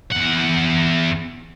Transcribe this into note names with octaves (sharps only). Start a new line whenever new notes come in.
E2 F#5